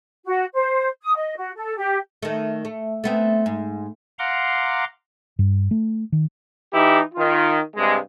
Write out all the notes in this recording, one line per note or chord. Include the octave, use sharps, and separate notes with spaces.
F#4
C5
D#6
D#5
F#4
A4
G4
D#3 A3
A3
A3 B3 C4
G#2
F5 F#5 A#5 C6 D6
G2
A3
D#3
E3 D#4 E4 G4
D#3 F4
G2 C3 G#3